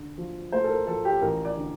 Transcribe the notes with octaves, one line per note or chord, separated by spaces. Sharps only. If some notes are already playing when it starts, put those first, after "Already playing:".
Already playing: D3
F3
A3 C5
A4
A#4
F3 A4
G4
A1 A#4
D5
D3